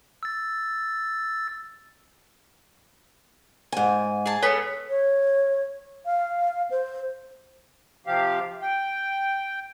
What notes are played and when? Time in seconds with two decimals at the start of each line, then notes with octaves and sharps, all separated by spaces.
0.23 E6 A6
3.72 G#2 G#5
4.26 G#4 A5
4.43 A3 B3 G#4 C#5 B6
4.90 C#5
6.06 F5
6.71 C5
8.06 C3 F3 G4 F5
8.62 G5